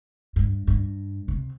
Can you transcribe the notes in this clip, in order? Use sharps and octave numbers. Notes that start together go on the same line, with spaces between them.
G2
G2
C3